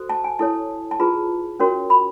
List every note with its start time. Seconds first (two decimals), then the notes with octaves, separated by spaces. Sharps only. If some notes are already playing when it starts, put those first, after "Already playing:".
Already playing: F#4 A4 C5
0.09 A5
0.24 G#5
0.39 E4 A4 C#5 A5
0.91 A5
1.00 F4 G#4 B4 A#5
1.60 C#4 F#4 A#4 C#5
1.90 B5